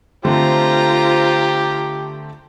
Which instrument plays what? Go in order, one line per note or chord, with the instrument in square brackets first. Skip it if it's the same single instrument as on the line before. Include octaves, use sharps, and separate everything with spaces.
[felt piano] D3 A3 C4 [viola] F4 A#5 [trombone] G4 [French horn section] C5